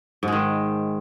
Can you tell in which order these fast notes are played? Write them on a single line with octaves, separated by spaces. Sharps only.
G#2 G#3 D#3